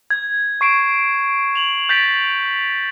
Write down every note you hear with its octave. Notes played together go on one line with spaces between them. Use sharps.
G#6
C#6 C7 D7 E7
F7 F#7
G6 A6 B6 D7